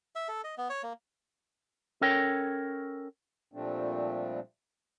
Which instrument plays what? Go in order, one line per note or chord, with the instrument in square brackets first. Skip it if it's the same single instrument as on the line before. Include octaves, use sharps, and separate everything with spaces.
[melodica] E5
A4
D#5
B3
C#5
A#3
[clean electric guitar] C#4 A4 A#4 C#5 G5
[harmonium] A#2 F3 G3 A3 C4 D4